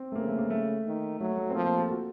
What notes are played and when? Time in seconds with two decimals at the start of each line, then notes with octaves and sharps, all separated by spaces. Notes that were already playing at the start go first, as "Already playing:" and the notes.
Already playing: C4
0.12 A3
0.15 C#3 A#3
0.28 A3
0.38 A#3
0.50 A3
0.86 D#3
1.20 F#3 A3
1.37 A3
1.50 C4
1.55 F3 A#3
1.66 A#3
1.78 A4
1.91 F#4